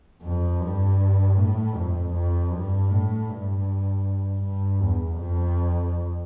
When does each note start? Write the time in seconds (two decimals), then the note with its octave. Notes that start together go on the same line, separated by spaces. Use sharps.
0.22 F2
0.60 G2
1.37 A2
1.75 F2
2.14 F2
2.52 G2
2.90 A2
3.28 G2
4.43 G2
4.81 E2
5.20 F2